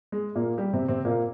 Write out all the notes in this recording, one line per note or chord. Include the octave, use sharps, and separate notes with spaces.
G#3
A#2 A#3
G3 G4
C3 C4
C3 C4
A#2 A#3